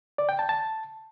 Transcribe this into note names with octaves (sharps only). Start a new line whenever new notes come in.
D5
G5
A5
A5